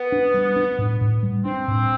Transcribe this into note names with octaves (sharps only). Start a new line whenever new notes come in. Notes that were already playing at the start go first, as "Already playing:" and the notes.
Already playing: B3
D4
G3
D4
A2
A2
G3
C4 D4
A2